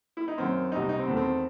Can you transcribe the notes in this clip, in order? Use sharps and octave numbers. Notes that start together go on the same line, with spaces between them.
E4
D#4
F#2 D#3 F#3 C4
C2 B2 G3 C4 D#4
D#4
C4
E2 D#3 A3
C4